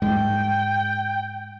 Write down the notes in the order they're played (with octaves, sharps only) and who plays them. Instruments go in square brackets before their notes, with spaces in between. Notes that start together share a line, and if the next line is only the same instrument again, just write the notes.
[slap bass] G#2 G#3 [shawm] G5